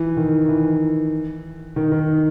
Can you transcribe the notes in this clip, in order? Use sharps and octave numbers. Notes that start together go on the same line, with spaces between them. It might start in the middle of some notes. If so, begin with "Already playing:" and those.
Already playing: E3
D#3
E3
D#3
D#3